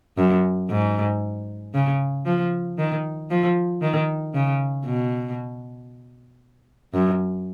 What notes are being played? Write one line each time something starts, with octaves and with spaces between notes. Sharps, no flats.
F#2
G#2
C#3
F3
D#3
F3
D#3
C#3
B2
F#2